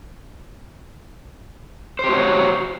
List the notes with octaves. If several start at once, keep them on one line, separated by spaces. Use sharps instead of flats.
F#4 G4 C5 C#5